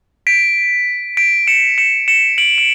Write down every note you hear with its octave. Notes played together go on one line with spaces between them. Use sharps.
B6 D7
B6 D7
C#7 E7
C#7 E7
C#7 E7
D7 F#7
D7